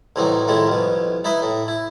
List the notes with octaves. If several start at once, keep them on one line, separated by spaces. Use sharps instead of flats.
C2 A2 E3 F#3 C4 D#4
F2 A2 D#3 G#3 E4
C2 F2 B2
D#4 E4 B4 D#5 E5
A2
E4